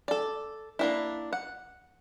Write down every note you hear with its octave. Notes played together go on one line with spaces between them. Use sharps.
A4 D5
A#3 D4 E4
F#5